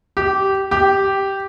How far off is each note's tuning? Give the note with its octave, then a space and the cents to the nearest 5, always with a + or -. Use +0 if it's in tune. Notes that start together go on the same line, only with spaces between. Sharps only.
G4 -15
G4 -5